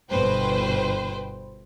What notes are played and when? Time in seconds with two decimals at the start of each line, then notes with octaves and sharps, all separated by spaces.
0.11 G1 B2 B4 C5 G5